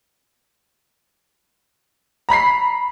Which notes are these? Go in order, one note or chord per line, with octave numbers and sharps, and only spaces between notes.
A#5 B5 B6 C7